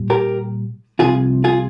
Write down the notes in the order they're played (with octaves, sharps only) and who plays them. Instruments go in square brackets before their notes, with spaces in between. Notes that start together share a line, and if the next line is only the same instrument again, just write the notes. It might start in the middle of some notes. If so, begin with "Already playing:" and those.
Already playing: [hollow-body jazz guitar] A#2 G3
G4 A#4
C2 C3 F3 F4 G#4
F4 G#4